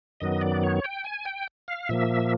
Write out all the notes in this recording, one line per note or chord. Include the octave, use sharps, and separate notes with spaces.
F#2 D#3 F#3 B3 D#5
D5
C#5
G5
G#5
G5
F5
A#2 F3 A#3 E5